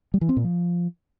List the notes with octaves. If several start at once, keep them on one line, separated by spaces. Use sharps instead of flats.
G3
E3
C4
A#2
F3